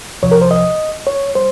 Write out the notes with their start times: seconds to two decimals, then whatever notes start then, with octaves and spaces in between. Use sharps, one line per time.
0.23 C2 C3 F3 C#5
0.31 A#4
0.42 C5
0.51 D#5
1.07 C#5
1.35 G3 C5